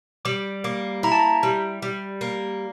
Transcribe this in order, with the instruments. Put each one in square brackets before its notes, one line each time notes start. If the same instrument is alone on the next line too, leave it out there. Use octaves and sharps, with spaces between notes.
[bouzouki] G3 [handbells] D6
[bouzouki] A#3 [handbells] D6
[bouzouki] E4 [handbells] A#5
[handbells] A5
A#5
[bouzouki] G3
G3
A#3